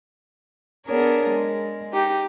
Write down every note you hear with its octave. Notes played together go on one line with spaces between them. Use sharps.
B3 D4 G#4 A#4 C#5
G#3
D#4 G4